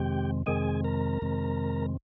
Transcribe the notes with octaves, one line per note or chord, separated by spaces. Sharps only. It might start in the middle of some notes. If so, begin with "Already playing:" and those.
Already playing: F2 C3 D#3 G#3 C4 G4 G5
F2 C3 D#3 G#3 C4 G#4 G#5
A#4 A#5
F2 C3 D#3 G#3 C4